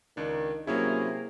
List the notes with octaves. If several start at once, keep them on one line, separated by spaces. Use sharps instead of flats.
C#2 D#3 D4
C3 F#3 A#3 C#4 E4 G#4